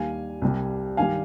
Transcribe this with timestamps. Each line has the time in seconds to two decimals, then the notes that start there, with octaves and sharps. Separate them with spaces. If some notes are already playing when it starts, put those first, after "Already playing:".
Already playing: D#2 D#3 G3 F5 G#5
0.42 C2 C3 G3
0.97 G2 D#3 G3 F5 G#5